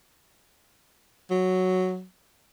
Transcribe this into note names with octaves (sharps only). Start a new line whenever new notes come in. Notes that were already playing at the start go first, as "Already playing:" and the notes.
F#3